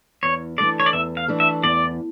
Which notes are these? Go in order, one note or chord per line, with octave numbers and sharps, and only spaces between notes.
E2 C#5
E3 A3 D4 A4 D5
C#5
D5
E2 E5
F5
E3 A3 D4 A4
E5
E2 D5